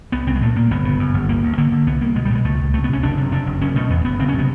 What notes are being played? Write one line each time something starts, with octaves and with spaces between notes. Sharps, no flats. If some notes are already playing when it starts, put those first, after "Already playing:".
C2 B3
C2 C4
G#3
A#2 A3
A#2 A#3
G1 B3
C#3
F#2
G1
D2 A#3
D2
D3 A#3
D3
C2 B3
C2 A#3
B2 G#3
G3
B2 G#3
C#2 A3
C#2
C3 A3
B3
C3 C#4
F#1 D4
C3
F2 D4
F#1
F#1 C#4
B2 A3
E2 B3
F#1 B3
F#1 C4
C#4
C3 B3